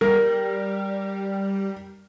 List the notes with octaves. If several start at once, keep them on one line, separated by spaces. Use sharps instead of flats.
G3 A#4